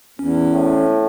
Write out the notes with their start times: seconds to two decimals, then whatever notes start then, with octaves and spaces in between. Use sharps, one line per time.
0.19 E2 C#4
0.54 A2